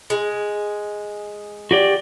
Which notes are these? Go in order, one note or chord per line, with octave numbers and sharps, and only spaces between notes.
G#3
F#4 G4 D5